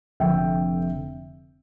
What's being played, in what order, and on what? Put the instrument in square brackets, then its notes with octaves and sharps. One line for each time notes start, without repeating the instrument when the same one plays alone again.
[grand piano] F1 F2 D3 E5 G5